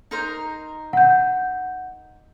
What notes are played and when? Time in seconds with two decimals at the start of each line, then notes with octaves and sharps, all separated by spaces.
0.11 D#4 A#4 C5
0.93 F#5 G6